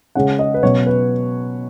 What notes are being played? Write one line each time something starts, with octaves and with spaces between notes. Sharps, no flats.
C#3 G#3 C#4 F#5
D#5
B4
B2 F#3 C#4 C#5
B4